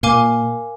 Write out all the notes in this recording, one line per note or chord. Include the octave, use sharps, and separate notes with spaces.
A#2 A#4 F5 G#5 D6